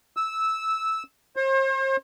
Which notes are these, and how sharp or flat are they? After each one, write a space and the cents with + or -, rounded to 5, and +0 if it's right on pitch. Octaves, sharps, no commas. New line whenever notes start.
E6 -10
C5 +40